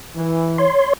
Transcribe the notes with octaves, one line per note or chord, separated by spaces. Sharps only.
E3
C#5 C6